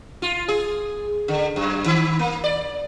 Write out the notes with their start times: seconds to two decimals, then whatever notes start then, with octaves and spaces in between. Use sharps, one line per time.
0.22 F4
0.48 G#4
1.28 D3
1.56 F#2
1.86 D#3
2.19 A#3
2.44 D5